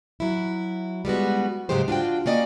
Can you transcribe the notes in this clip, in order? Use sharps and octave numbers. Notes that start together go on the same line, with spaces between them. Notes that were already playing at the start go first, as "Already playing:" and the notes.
F#3 E4
G3 G#3 B3 F#4
G#2 C#3 F#3 G#3 G4 C5
D4 F4 F#4 G5
A#3 C#4 D5 D#5